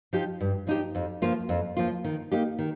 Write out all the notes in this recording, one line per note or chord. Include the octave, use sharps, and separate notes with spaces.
F3 D#4 G4
G2
F3 D#4 G4
F2
F3 A#3 F4
F2
F3 A#3 F4
D#3
A#3 D#4 G4
D#3